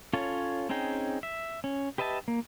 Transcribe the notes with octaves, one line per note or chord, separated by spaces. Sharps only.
C#4 F4 A4 C#5
C4 C#4 D#4 G#4 G5
E5
C#4
G4 B4 D#5 E5 A5
A#3